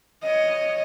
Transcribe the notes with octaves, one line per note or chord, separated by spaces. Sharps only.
C#5 D#5